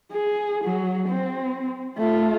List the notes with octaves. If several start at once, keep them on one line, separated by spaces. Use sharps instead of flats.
G#4
F#3
C4
A3 F4